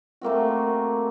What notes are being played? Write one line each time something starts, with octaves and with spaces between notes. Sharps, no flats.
A3 A#3 C4 F#4